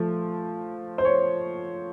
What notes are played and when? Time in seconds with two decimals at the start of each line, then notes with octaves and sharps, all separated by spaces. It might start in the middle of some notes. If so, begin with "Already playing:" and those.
Already playing: F3 A3
0.98 C5
1.05 C#5